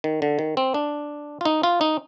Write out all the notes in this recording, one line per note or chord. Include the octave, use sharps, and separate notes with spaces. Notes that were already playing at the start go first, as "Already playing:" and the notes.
D#3
D3
D#3
C4
D4
F4
D#4
F4
D#4